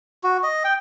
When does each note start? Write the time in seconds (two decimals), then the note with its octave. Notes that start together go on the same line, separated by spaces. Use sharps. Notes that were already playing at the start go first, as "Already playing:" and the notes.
0.23 F#4
0.43 D#5
0.64 G5